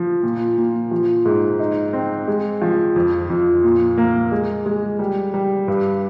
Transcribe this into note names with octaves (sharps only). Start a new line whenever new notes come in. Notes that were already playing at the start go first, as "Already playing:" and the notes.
Already playing: F3
A#2
A#2
F3
G#2
D#4
C4
G#3
F3
F2
F2
A#2
A#3
G#3
G#3
G3
G3
G2